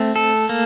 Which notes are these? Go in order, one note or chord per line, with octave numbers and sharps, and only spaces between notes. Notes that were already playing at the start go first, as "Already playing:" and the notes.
Already playing: A3 C4
A4
A#3